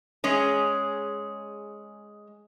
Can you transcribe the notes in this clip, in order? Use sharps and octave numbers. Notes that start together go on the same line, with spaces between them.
G#3 C#4 G#4